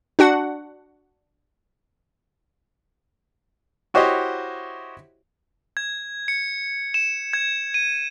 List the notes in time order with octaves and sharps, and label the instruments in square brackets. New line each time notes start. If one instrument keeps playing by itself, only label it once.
[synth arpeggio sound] D4 F#4 F#5
[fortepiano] E4 F#4 G4 C5 C#5 D#5
[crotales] G#6
C#7
E7
G#6
D#7